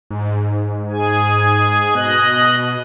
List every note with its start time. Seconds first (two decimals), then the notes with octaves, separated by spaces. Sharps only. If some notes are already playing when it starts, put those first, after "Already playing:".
0.11 G#2
0.91 G#4 G#5
1.95 B2 D#5 F#6